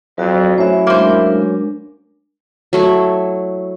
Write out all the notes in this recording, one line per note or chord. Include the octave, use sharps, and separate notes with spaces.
F2 F#3 F#4 D5
F#3 A3 C#4 E4 C5 E5
G#3 A#3 D4 A#4 C5
F#3 A3 E4